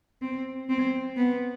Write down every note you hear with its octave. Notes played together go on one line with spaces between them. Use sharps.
C4
C4
B3